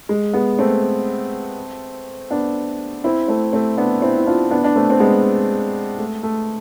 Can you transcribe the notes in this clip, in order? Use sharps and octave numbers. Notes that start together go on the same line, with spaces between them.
G#3
G#3 B3
A3 C4
B3 D4
C4 E4
A3 C4
A3 C4
B3 D4
C4 E4
E4
D4 F4
B3 D4
D4
A3 C4
C4
G#3 B3
A3
A3